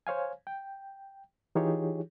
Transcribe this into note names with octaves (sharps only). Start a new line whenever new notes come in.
C5 C#5 F5 G#5
G5
E3 D#4 F4 G4 G#4 C#5